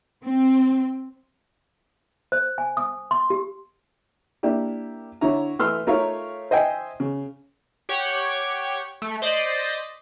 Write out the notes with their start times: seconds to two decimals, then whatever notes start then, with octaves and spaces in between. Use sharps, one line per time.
0.23 C4
2.32 C5
2.58 G#5
2.77 D#6
3.11 C6
3.30 G4
4.43 A#3 D4 E4 G4
5.21 D3 E4 C#5 A#5
5.59 E3 A3 C6 E6 F6
5.87 A3 D#4 F4 A#4 C#5 F5
6.51 C5 D#5 E5 G5 G#5
7.00 C#3
7.89 G4 C#5 F#5 G5 C#6
9.02 A3
9.22 C5 D5 D#5 A6 B6